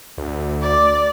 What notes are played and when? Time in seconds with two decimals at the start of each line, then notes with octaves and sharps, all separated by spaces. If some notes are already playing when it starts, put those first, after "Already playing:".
0.18 D2
0.62 D5